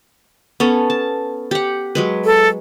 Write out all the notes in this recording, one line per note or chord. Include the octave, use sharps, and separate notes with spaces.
B3 C#4 A4
A5
G4 F#5
F#3 G#3 B4
A4